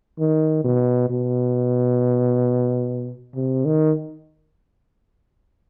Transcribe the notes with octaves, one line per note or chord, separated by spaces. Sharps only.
D#3
B2
B2
C3
D#3